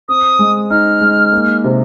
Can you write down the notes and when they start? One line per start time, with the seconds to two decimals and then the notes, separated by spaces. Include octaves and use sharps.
0.08 C4 D#6
0.39 G#3
0.70 D#4 F6
1.01 G#3
1.32 A#3
1.64 C3